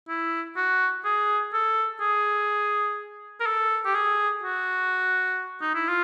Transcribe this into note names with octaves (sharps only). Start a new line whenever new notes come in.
E4
F#4
G#4
A4
G#4
A#4
A4
G4
G#4
F#4
D#4
E4
F4